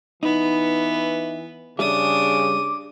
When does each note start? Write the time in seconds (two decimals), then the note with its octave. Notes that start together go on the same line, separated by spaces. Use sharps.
0.23 E3 B3 D#4
1.79 C#3 G3 D4 G#4 E5 D6 D#6